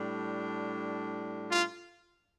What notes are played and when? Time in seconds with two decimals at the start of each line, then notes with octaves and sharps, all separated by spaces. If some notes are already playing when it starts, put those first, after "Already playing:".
Already playing: A2 G3 D4
1.51 F4